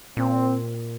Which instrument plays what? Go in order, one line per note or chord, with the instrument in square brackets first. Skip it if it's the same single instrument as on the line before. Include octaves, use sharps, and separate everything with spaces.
[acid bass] A#2 [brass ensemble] C4